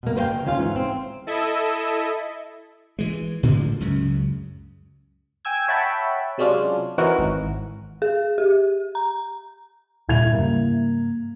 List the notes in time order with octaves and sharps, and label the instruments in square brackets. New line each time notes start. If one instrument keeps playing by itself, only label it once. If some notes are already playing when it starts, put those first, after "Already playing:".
[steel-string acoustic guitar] B2 A#3
A#3 B4 C5 F5 G5
C#3 F#3
D#2 C#4 F4 C#5 F5
G#2 E3
C4
[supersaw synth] E4 A4 D#5 E5
[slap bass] E3 G#3
A2 D3 F3 G#3
C#2 F#2 C#3
[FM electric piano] G5 G#5 E6 G#6
C#5 E5 F#5 G5 A5 B5
C3 F#3 G#3 C#4 D4 F4
E3 C4 C#4 D#4 F#4 A#4
G#1
[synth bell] G#4
G4
A#5
[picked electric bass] D#2 A#2 G3 [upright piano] E4 G#6 F7
[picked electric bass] G#2 C#3 G3 [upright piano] A#3